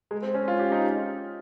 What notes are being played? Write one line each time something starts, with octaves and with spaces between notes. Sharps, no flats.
G#3
C4
C#4
F4
G4
D#4